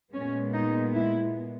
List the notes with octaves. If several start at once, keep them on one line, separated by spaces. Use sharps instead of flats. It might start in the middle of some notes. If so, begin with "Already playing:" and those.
A#2 G#3 B3 C#4
D#4
E4